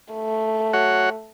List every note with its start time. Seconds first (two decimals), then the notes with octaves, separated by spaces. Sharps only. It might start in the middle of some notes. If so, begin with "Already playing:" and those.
0.14 A3
0.73 F#4 C#5 F#5